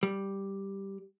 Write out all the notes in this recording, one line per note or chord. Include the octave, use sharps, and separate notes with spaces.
G3